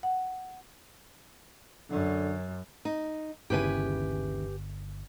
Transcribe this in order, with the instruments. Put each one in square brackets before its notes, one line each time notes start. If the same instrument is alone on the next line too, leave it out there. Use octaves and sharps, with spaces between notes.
[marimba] F#5
[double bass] F#2 [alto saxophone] D3
[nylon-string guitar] D#4
[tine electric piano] G1 [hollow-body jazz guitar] D#2 C#3 E4 [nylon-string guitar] G4 B4 G#5